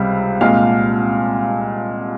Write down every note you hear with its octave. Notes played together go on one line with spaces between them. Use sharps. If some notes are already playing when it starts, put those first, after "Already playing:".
Already playing: C#2 C3 G3 F5
C2 A#2 G#3 F5 F6